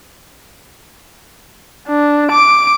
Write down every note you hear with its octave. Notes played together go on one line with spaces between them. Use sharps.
D4
D6 D7